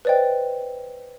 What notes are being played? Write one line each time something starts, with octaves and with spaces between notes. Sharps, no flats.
B4 C5 D5 D#5 G5